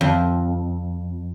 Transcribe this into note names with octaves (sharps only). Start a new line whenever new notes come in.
F2